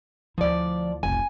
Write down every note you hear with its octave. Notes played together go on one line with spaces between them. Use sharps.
D2 F3 E4 D5
F1 B1 G#5